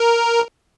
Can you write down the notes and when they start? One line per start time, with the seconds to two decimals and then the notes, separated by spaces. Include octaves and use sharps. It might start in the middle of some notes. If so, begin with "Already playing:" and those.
Already playing: A#4